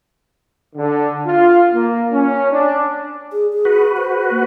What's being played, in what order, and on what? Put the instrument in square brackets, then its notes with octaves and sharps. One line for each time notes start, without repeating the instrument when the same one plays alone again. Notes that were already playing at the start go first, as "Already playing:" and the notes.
[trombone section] D3
F4
A#3
C#4
D4
[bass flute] G#4
G#4
[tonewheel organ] F#4 B4
[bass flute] C5
A#3